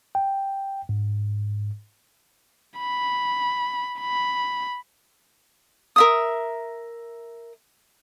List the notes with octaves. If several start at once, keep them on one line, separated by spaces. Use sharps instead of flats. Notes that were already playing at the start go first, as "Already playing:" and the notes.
G5
G#2
B5
B5
A#4 E5 D#6